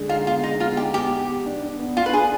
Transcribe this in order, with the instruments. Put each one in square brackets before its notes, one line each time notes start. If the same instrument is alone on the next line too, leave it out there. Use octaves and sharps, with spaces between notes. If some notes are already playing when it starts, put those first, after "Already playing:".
Already playing: [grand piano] D3 G#3
[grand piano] D#4 [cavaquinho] F4
[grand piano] B3 [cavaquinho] F4
[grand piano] G#3 [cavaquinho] D#4
[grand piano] B3 [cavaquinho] F4
[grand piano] D#4 [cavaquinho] G4
[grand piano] B3 [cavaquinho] G4
[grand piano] B3
B3
D4
D4
B3
[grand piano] D4 [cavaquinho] F4
[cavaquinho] B4
[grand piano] D4 [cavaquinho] G#4